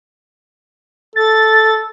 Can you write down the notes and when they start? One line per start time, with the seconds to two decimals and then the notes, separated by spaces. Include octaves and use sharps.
1.16 A4 A6